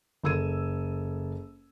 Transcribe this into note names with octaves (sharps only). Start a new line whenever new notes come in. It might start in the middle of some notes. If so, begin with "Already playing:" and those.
F#1 A4 E6 G#6 D#7